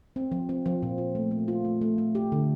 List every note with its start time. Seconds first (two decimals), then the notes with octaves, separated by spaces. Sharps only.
0.16 C4
0.32 F3
0.49 C4
0.66 F3
0.83 A#2
0.98 A#2
1.15 A3
1.31 A3
1.48 F4
1.65 A3
1.81 A3
1.98 A3
2.15 G4
2.32 D3